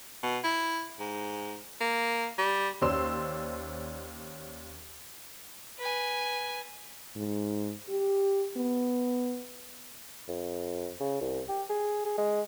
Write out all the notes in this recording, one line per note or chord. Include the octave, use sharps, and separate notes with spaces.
B2
E4
G#2
A#3
G3
D#2 C#4 C5 D5 C6 E6
B4 G#5
G#2
G4
B3
F2
C#3
C2
G4
G#4
G#4
G#3